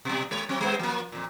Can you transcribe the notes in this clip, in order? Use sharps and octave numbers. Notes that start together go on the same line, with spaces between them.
B2 G3
G#3 C#5
F#3 C4
G3 B3 C5
F3 A#3
F2 A#2